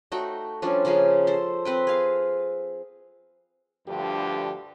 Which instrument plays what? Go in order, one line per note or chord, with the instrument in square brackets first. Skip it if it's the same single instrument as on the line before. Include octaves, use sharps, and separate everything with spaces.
[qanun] A3 D#4 F#4 G5
F3 G3 C#4 D4
C#3 F3 A#3 G#4
A4 C5
C4 B4 G5
G#4 F5
[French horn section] D2 G2 D3 F3 G4